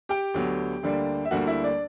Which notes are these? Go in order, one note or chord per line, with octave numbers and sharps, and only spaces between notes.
G4 G5
D2 D3 F#3 B3
D2 D3 G3 A#3 D4
E5
D2 D3 G3 A#3 D4 F#4 F#5
E4 E5
D4 D5